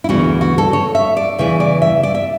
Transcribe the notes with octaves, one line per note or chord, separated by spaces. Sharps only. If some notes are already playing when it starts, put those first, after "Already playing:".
E4
D2 C#3 E3 B3 F#4
F#4
A4
C#5
E5
D5
E2 C#3 E3 E5
D5
E5
D5
E5